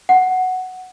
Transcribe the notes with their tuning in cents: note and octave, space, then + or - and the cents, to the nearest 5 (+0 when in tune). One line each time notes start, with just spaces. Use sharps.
F#5 +5